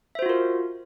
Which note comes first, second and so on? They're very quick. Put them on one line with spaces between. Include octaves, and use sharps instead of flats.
E5 C5 F#4 F4 A#4